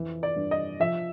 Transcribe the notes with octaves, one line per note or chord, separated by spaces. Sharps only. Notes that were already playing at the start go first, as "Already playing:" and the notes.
Already playing: F2 E3
D5
G2
D#5
F3 E5